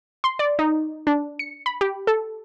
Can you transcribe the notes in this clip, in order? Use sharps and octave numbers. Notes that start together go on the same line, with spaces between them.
C6
D5
D#4
D4
C#7
B5
G4
A4